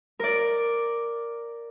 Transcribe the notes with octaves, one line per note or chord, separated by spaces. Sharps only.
A#4 D5